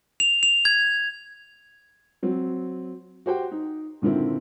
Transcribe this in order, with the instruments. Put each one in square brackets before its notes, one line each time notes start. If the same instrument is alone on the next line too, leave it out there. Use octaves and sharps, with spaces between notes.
[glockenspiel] F7
F7
G#6
[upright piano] F#3 C4
F#4 G4 C5 F#5 G5
D#4
A#2 D3 D#3 C4 E4